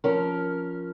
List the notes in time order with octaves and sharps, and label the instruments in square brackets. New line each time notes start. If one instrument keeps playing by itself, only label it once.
[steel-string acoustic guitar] F3 C#4 A#4